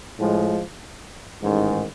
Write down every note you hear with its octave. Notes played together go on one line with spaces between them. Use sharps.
A2 F3 G#3
A1 G#2 D#3 G#3